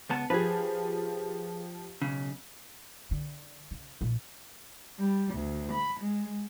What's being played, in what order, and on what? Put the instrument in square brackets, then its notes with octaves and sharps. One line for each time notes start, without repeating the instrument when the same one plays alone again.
[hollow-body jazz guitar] C#2 B3 A5
[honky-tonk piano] F3 G4 [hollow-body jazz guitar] G#4 B4
[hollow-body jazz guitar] B1 C#3
[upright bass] D3
C#3
A#1
[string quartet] G3
D2
B5
G#3